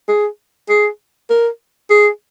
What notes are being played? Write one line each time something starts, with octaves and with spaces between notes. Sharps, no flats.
G#4
G#4
A#4
G#4